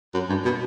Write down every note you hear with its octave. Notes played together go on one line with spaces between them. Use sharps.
F#2
G2
B2